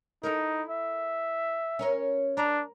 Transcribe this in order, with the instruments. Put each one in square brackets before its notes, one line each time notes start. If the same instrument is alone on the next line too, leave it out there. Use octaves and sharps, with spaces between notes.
[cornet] D#4 [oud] E4 A4 A#4
[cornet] E5
[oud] C#4 A#4 C#5
[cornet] D4 [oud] A#4